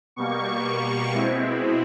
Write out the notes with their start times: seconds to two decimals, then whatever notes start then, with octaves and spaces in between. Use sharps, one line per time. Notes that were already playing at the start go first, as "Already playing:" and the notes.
0.16 B2 G3 A#3 C#6
1.11 B2 G#3 C4 E4